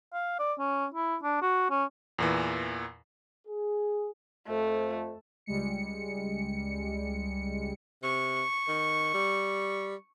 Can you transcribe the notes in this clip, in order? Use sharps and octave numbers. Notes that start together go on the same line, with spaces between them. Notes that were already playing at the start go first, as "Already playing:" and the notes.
F5
D5
C#4
E4
D4
F#4
C#4
E2 A#2 E3
G#4
F2 A3
C#2 G3 G#3 C#7
C3 C#6
D#3
G3